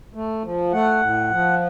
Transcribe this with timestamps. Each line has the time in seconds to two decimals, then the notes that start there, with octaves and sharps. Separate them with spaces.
0.15 A3
0.44 F3
0.73 A3 F#5
1.02 A2
1.31 F3